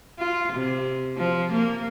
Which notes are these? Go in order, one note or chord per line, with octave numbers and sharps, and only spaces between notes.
F4
C3
F3
A#3